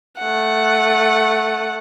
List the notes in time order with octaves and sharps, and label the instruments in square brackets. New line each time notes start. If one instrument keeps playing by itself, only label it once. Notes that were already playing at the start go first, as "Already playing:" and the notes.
[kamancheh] A3 F#5